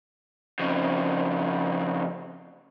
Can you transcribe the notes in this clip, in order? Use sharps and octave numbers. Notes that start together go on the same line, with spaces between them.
F2 C#3